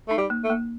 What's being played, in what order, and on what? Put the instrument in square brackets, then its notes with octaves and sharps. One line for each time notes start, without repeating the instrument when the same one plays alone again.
[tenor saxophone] A3 [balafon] D#4
[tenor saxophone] G3
[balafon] A#3
[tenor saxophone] A3
[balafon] A#3